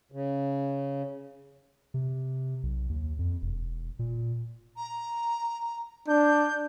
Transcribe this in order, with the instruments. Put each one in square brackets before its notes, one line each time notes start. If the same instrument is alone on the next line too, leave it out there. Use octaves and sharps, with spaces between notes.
[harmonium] C#3
[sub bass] C3
B1
D#2
F2
E1
A#2
[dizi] A#5
[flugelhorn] D4 [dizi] G6